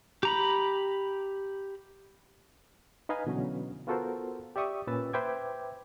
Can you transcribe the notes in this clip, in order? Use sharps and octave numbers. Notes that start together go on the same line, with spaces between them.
G4 A#5 B5
D#4 B4 D#5 F5 G#5 B5
B2 D3 E3 F#3 C#4
B3 F4 F#4 A4 A#4 C5
G4 D5 E5 C#6 D#6
A#2 C#4 B4 E6 A6
B4 C5 E5 G5 D6 G#6